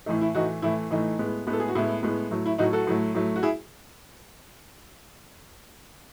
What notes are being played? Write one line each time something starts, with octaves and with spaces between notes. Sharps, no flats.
A2 E3 A3 D#4
E4
A2 E3 A3 D#4 F#4
A2 E3 A3 E4
A2 E3 A3 D#4
A2 G#3 B3
A2 G#3 B3
A4
G#4
F#4
A2 G#3 B3 E4
A2 G#3 B3
A2 F#3 A3
E4
A2 F#3 A3 D#4 F#4
F#4 A4
A2 F#3 A3
A2 F#3 A3
F#4
E4 G#4